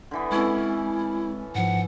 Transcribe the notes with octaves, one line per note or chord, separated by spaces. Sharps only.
D3 E3 B3
G#3 C4 C#4 E4 A4
G#2 F3 F#5